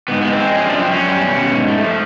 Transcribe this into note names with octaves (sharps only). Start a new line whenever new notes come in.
G#2 B3
G#3 B3
C4
G#3
F3 C#4
D4
F#2
C4
F#2 C#4
G3
B2
B2
G#2
A3
F3